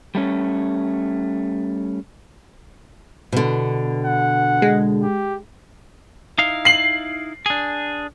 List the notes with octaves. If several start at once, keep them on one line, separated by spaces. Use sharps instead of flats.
G3 A3 C#4
B2 D3
F#5
G#3
G4
D#4 E4 F5
C7 F#7
D4 G#4